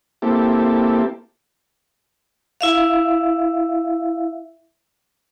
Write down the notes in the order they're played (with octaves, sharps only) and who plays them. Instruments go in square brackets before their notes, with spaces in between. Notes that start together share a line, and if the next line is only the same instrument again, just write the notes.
[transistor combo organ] A#3 C4 E4 G4 A4
[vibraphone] E4 E5 F5